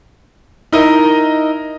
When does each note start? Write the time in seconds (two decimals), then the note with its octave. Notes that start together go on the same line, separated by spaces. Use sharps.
0.72 D#4 E4 A#4 D#5